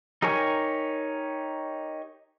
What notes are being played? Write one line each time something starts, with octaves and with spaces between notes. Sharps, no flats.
D#4 G4 A#4 C#5 G#5